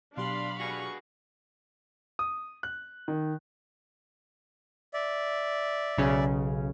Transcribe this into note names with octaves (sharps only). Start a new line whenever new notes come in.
B2 F#3 D4 G4 F5 B5 C6
F#4 G#4 B4 C#6
D#6
F#6
D#3
D5 E5
B1 C#3 C#4